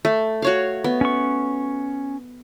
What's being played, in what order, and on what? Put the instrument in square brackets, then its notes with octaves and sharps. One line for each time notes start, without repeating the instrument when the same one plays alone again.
[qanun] A3
F#4 C#5 F5
B3
[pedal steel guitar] C#4 C#6